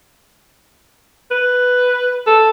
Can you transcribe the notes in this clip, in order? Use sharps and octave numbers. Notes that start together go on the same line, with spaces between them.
B4
A4